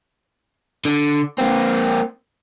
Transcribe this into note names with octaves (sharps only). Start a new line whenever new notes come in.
D3
A#3 C4